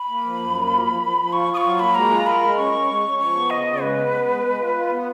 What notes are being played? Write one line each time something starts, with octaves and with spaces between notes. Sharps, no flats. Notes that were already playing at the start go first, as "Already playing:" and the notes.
Already playing: B5
A#3
F3
F#2
A#3
F3
F3
F3
F3
F4 C#6
F4
D#6
C#6
F#3
C#6
A#3 B5
G#3 A#5
F4
A#4 B5
G#3
C#4 C#6
C#4
G#3
C#4
F3 C#6
B3
C#3 D#5
C#3
G#3 B4
B3
B3
G#3
G#3
F4
F4
B3